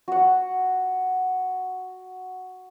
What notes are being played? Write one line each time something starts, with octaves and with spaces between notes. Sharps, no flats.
F#4 F#5